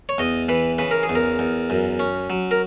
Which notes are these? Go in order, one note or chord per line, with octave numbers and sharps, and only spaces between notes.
C#5
E2 D#5
E3 B4
C#3 B4
A#4
G#4
E2
A#4
E2
F#2
C#4
F#3
A#4